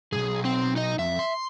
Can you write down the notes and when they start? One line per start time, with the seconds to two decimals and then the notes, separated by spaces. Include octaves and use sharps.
0.13 B1 G2 G#4
0.45 C4
0.76 D#4 D#5
0.99 F2 E5
1.19 C6